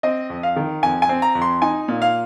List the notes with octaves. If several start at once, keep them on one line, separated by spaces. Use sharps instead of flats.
C4 D#5
F2
F5
D#3
F2 G#5
G#5
C4
A#5
F2
C6
D#4 G#5
A#2
F5